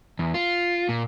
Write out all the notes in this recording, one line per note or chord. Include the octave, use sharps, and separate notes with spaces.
E2
F4
A#2